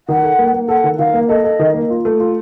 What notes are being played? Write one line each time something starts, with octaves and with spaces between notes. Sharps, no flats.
D#3 F#5
A4
A#3
A#3
A4 F#5
D#3
D#3 F5
A#3
A4 D#5
A4
D#3
A#3
F4
A3
F4